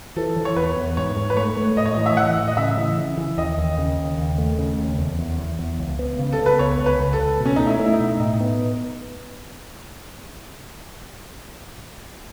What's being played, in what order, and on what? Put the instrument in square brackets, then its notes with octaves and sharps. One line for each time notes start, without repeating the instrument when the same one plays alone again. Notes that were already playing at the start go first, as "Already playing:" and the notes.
[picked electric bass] E3 [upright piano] A4
[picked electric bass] E3
[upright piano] C#5
[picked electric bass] E2 [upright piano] B4
[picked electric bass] E2
[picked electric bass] G#2 [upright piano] C#5
[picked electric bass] G#2
[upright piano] B4
[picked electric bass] A3 [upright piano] C#5
[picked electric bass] A3
[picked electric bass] A2 [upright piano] D#5
[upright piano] C#5
[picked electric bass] E3 [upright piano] D#5
[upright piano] E5
[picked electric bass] E3 [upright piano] F#5
[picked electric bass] A2
[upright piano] D#5
[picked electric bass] C#3 [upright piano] E5
[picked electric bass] E3
C#3
E3
[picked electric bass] D#2 [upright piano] D#5
[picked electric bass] D#2
C#3
D#2
D#2
A3
C#3
D#2
E2
E2
E2
E2
C#2
B3
C#3
[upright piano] A4
[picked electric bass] B3
[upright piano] B4
[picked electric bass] C#2 [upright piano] C#5
[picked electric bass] C#2
[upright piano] B4
[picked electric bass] C#2
[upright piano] A4
[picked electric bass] C#2
B2
[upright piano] C#4
[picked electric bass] A3 [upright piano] D#4
[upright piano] E4
[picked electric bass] A3
[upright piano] E4
D#4
[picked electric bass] B2
[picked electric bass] A2 [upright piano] D#4
[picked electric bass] B3